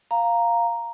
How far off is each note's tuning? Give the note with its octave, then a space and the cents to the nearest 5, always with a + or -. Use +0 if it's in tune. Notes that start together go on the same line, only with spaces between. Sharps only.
F5 +0 A#5 +0